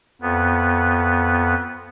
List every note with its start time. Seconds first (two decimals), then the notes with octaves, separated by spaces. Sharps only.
0.21 F2 B3